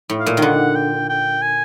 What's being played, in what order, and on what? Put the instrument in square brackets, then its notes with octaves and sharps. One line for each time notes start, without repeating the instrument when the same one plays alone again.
[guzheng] A2
[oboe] F5
[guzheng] A#2
D#3
[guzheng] D3 [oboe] F#5
[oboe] G5
G5
G#5